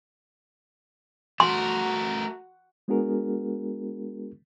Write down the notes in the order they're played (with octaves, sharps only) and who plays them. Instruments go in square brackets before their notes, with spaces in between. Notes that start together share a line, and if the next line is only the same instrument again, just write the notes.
[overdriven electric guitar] A3 A#4 [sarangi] F#4 [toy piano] C6
[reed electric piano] G#3 B3 D4 F#4 G#4 A#4